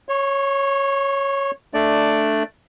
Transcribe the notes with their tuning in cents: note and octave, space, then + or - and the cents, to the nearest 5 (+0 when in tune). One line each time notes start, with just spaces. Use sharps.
C#5 -5 C#6 -45
A3 +0 D4 +0 D5 +0